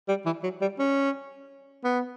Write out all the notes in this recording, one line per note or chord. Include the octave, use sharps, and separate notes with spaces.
G3
E3
F#3
G3
C#4
B3